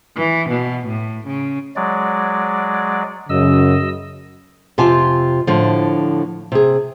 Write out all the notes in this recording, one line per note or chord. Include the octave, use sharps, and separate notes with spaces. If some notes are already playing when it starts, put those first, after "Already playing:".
E3
B2
A2
C#3
F#3 G#3 D5
F#2 C#3 D#5 E6
F2 C3 F4 G4 G#5 A5
A2 D3 F3
C3 G#4